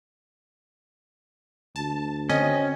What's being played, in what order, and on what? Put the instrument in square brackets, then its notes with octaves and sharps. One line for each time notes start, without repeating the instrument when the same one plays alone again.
[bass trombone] D2 [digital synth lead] A5
[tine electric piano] D3 C4 [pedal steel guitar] C#4 [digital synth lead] D#5